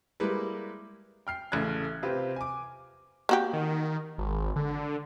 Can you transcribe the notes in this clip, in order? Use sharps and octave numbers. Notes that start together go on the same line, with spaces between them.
G3 G#3 A#3 E4 B4
G5 F6 C7
A1 C#3 A3 F#6 G#6
C3 C4 F4 G4 B4
G#5 D6
A#3 F#4 G4
D#3
G#1
D3